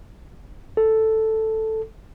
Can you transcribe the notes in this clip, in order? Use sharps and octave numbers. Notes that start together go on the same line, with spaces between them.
A4